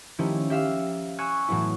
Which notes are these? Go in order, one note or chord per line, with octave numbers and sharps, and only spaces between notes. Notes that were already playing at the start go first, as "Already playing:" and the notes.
D#3 F3 A3 C#4 E4 G4
G4 E5 F5 E6
G#5 C#6 E6 F#6 G#6
A2 E3 F#3 B3 E4